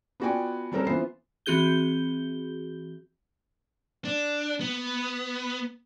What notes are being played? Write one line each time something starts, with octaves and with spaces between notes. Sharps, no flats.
B3 F4 F#4 D5 G5 G#5
G3 C4 C#4 A4 A#4 C5
E3 B3 F4 C5 C7
E3 C4 F#4 G#4 G6 G7
D4
B3